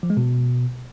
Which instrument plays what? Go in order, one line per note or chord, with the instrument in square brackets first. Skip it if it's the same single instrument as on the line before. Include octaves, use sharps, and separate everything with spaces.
[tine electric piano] F3
G#3
B2